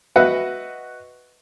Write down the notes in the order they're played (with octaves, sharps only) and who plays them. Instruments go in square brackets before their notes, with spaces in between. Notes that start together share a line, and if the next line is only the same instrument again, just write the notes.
[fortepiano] F#4 B4 D#5 E5 F#5